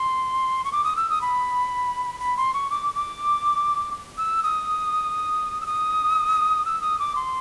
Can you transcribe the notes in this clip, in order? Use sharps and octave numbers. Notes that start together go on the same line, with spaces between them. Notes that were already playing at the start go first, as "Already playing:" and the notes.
Already playing: C6
C#6
D6
D#6
E6
D#6
B5
B5
C6
C#6
D6
D6
E6
D#6
E6
D#6
E6
D#6
D6
C6